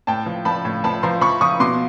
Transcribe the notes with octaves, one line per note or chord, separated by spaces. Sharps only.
A2 G5 A5
F3
F3 A5 B5
A2
F3 A5 B5
F3 A#5 C6
F3 B5 C#6
F3 C#6 D#6
B2 C6 D6